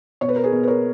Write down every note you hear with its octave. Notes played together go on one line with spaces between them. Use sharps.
B2 C#5
B4
A#4
G#4 B4
B2
B4
A#4 C#5